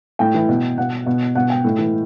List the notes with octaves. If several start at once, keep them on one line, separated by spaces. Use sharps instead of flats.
A2 G5
E3
B2
B2 F#5
B2
B2 F#5
G5
A2
E3